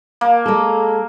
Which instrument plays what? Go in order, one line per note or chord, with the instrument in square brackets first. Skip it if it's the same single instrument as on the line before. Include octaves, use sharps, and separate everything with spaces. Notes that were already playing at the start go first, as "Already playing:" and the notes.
[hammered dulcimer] A#3
[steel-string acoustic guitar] G#3 A4